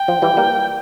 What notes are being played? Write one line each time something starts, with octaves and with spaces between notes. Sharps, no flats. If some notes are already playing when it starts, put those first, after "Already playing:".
Already playing: G5
F3
E3 G3
G3 A#3